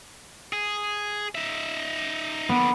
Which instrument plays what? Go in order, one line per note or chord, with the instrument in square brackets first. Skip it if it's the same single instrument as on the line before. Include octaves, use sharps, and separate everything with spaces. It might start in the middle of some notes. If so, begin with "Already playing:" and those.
[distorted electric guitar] G#4
D#4 E5
[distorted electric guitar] D3 D#3 [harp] B3